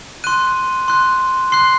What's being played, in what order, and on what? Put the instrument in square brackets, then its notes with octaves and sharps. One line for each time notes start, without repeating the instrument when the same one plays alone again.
[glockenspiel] C6 F#6 D#7
C6 F#6
C6 F#6 C7